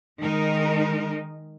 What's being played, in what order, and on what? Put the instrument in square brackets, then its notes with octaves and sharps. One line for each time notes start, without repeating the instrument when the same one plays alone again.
[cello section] D#3 G#3 D#4 A#4